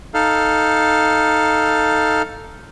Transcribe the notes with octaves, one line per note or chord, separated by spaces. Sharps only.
D#4 A4 F5